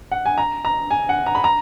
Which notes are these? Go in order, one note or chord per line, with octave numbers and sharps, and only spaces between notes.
F#5
G#5
A#5
A#5
G#5
F#5
A#5
B5
A#5